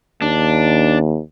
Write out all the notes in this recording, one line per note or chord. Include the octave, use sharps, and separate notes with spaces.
D#2 D4